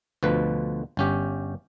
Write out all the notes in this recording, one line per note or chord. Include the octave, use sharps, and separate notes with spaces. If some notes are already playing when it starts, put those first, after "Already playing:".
D2 B2 F3 B4
G1 C#4 G4